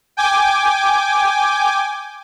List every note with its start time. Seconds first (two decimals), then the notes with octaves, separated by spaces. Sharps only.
0.17 G5 G#5 D6